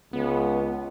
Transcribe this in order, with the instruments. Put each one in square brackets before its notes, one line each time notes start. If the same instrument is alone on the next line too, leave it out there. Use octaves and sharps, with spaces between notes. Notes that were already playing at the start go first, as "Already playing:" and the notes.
[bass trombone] C#2 [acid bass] B3